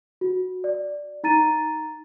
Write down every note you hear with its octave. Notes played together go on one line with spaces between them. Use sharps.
F#4
D5
D#4 A#5 A6 D#7